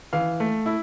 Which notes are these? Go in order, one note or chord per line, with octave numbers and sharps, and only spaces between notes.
E3 F5
A3
E4